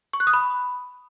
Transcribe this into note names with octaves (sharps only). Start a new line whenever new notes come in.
C#6
F#6
D#6
B5